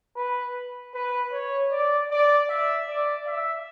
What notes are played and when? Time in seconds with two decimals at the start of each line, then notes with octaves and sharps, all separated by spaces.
0.16 B4
0.94 B4
1.32 C#5
1.71 D5
2.11 D5
2.49 E5
2.88 D5
3.27 E5